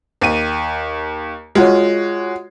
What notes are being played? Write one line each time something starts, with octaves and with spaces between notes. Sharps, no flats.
D#2 D#7
G#3 F4 F#4 C#5